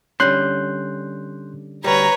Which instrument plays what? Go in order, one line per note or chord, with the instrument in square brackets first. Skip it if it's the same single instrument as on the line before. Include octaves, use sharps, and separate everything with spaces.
[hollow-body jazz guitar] D3 G3 C#4 [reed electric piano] C6 F#6 G6
[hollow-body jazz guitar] D2 G3 [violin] B4 C#5 [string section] A#5